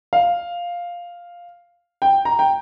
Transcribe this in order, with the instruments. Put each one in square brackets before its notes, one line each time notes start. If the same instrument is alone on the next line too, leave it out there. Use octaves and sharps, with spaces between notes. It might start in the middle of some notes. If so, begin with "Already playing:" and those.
[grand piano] F5
G5
A#5
G5